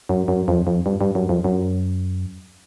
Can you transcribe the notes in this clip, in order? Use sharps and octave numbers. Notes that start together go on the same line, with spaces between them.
F#2
F#2
F2
F2
G2
G2
F#2
F2
F#2